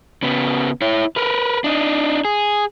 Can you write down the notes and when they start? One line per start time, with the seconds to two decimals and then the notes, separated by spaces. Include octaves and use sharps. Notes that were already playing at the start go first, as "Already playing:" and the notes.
0.23 C#3 B3
0.82 E4 C#5
1.16 A#4 B4
1.64 D4 D#4
2.25 G#4